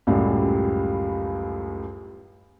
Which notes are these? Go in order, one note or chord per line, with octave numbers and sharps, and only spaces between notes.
C#2 F#2 A2 F#3 G3